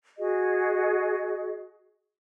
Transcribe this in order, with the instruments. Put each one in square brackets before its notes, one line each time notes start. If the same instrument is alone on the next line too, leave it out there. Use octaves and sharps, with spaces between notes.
[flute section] F#4 G#4 D#5